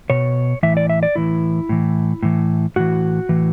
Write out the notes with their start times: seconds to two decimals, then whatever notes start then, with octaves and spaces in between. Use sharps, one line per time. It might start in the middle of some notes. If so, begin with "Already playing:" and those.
0.10 B2 C#5
0.63 A2 E3 E5
0.77 D5
0.90 E5
1.03 D5
1.16 A2 E3 E4
1.69 A2 E3
2.23 A2 E3
2.76 A2 E3 F#4
3.29 A2 E3